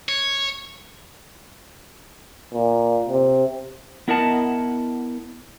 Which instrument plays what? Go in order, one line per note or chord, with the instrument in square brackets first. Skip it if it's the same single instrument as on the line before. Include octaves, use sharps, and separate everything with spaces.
[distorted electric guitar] C#5
[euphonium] A#2
C3
[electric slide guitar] B3 E4 A#4 D#5 F#5 A5